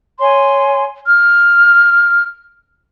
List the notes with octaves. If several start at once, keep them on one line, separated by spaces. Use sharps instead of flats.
C#5 G#5 C6
F6